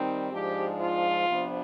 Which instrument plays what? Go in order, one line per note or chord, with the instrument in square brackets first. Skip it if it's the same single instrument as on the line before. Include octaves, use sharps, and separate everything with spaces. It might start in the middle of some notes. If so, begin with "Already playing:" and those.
Already playing: [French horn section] D#3 G3 C4 D#4
G#2 F3 G#3 D4 G4
F4
C3 F3 B3 D4